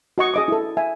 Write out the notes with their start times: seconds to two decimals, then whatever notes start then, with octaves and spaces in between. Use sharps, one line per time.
0.18 F#4 D#5 C#6
0.34 G#4 D#5 D6
0.48 E4 A4
0.77 E5 G#5